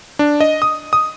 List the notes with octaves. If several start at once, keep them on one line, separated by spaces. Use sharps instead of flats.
D4
D#5
D#6
D#6